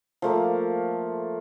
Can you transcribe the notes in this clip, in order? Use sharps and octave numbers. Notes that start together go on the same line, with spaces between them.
F3 A3 A#3